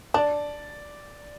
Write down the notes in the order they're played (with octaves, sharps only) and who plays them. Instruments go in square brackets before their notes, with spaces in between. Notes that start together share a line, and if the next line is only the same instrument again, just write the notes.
[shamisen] D4 [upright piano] D5